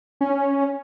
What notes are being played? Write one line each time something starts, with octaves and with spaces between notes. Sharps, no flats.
C#4